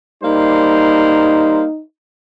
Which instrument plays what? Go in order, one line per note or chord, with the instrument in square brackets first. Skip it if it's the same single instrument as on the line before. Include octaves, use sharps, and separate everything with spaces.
[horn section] G3 A#3 C5 [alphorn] D#4